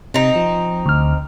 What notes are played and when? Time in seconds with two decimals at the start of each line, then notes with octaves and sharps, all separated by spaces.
0.14 C3 C4 D#4
0.36 F3
0.86 D2 F6